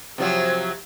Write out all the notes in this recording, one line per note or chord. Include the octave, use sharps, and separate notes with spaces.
C3 F3 F#3